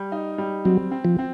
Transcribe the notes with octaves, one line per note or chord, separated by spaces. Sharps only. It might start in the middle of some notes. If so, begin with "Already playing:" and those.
Already playing: G3
D#4
G3
F#3 C4
C4
F3
C4